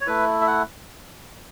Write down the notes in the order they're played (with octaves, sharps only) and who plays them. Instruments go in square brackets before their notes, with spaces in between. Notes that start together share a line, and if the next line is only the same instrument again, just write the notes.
[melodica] C#5
A3 E4 B4
E5
F#5